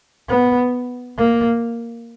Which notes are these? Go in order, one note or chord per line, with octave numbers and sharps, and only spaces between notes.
B3
A#3